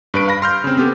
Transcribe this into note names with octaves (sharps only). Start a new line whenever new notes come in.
G2 B4 D7
F5 B5 A#6
C6 F6 G6
C#3 C4
B3 G4 A4